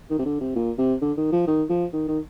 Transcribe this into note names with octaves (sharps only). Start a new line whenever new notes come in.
D#3
C3
D3
C3
A#2
C3
D3
D#3
F3
D#3
F3
D#3
D#3